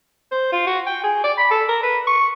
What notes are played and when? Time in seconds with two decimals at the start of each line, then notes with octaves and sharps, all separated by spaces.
0.32 C5
0.52 F4
0.67 F#4
0.87 G5
1.04 G#4
1.24 D5
1.38 B5
1.51 A4
1.69 A#4
1.83 B4
2.07 C#6